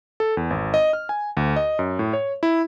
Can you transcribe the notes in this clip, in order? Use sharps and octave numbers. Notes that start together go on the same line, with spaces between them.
A4
E2
G#1
D#5
F6
G#5
D2
D#5
F#2
A2
C#5
E4